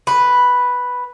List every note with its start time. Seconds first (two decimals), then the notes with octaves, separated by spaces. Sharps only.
0.07 B4